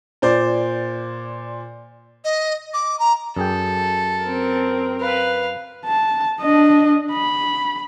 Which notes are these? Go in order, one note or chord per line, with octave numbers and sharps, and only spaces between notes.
A#2 C5 D5
D#5
D6
A#5
F#2 G#4 A4 G5
C4 A#4
B4 F5
A5
D4 D#5
B5